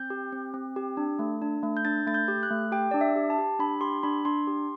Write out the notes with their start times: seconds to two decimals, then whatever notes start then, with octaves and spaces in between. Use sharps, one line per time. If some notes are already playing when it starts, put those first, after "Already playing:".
Already playing: C4 G6
0.10 G4
0.33 C4
0.54 C4
0.76 G4
0.97 D4
1.19 A3
1.42 D4
1.63 A3
1.77 G6
1.85 D4 A6
2.07 A3 A6
2.14 G6
2.28 G4
2.43 F#6
2.50 A3
2.72 G4 G5
2.91 D4 D5
3.01 E5
3.16 G4
3.30 A5
3.38 G4
3.59 D4 B5
3.81 G4 C6
4.03 D4 B5
4.25 D4 C6
4.47 G4